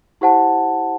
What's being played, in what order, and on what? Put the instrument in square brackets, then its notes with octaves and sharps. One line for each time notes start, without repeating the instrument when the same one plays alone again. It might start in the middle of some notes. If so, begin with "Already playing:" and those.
[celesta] E4 G4 C5 F#5 A5